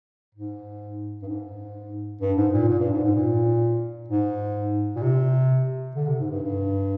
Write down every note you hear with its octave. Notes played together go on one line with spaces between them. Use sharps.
G#2
G2
G#2
G2
G#2
A#2
A#2
G2
G#2
G#2
A#2
G#2
A#2
C3
D3
C3
G#2
G2
G2